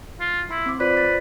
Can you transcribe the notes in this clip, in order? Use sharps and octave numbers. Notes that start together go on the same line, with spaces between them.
F4
E4 C6
C4 D6
F4 B4 C5 D5
A6